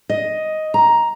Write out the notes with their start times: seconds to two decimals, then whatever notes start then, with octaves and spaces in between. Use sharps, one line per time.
0.09 D#5
0.74 A#5